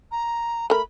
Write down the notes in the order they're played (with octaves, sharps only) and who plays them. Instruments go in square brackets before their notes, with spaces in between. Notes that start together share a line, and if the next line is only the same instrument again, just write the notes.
[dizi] A#5
[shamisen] A3 A#4 [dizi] B5